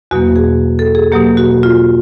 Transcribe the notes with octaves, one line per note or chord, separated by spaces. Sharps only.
E2 B2 F#3 A#3 F#4
G#4
A4
G#4
B2 F#3 A#3 G4
F#4
F4